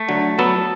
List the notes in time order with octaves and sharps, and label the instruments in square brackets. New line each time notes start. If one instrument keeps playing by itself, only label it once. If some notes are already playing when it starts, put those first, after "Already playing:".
Already playing: [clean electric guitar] A3
[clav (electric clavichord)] D3 F#3
[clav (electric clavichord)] F#3 B3 [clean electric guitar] A4